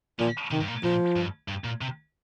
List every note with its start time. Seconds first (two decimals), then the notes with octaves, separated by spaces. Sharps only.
0.19 A#2 F3
0.51 C3 D#3
0.61 G2
0.68 A#2
0.84 A#2 F3
1.16 G2
1.48 G2
1.64 A#2
1.81 C3